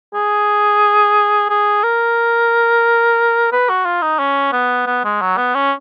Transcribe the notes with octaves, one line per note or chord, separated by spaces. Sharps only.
G#4
G#4
A#4
B4
F#4
F4
D#4
C#4
B3
B3
G#3
F#3
B3
C#4